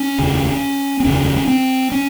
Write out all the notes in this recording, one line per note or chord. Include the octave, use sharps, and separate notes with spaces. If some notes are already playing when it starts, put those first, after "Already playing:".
Already playing: C#4
F1 D#2 C#3
C4
F1 D#2 C#3 C#4
C4
C#4